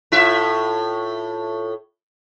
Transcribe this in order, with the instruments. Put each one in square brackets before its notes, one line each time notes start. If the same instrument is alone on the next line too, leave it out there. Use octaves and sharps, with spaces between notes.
[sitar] A2 F4 E5